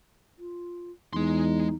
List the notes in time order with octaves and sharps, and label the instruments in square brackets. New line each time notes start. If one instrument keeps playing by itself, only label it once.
[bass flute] F4
[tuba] E2 [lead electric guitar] G#3 C6 [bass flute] D#4